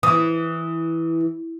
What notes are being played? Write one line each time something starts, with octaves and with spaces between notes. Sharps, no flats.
E3 D#6